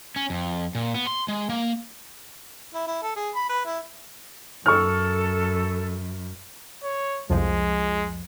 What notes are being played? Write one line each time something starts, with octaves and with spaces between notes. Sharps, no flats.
C#4
F2
A#2
B3
C6
G#3
A#3
E4
E4
A4
G#4
B5
B4
E4
F#2 A4 C#6 F6
C#5
C2 F2 F3 G#3